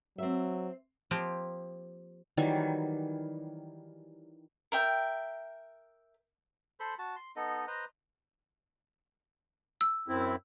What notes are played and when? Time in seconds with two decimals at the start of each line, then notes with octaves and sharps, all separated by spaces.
0.18 F#3 C4 E5
1.11 F3 A#3 C4 G4
2.37 D#3 E3 F#3 G3
4.72 A#4 E5 G5
6.80 A4 C5 B5 C6
6.99 F#4 A5
7.16 C6
7.36 B3 D#4 A4 D#5
7.67 B4 C5 D#5 A#5
9.81 E6
10.08 F#2 C4 E4